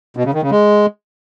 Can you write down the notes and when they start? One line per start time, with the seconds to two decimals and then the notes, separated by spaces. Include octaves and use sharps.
0.17 B2
0.25 C#3
0.34 D#3
0.42 C#3
0.51 G#3